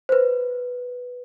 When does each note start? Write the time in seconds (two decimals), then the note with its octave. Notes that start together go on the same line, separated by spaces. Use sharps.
0.09 C5
0.12 B4